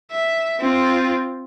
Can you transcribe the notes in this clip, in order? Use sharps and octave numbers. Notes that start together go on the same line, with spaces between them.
E5
C4 F4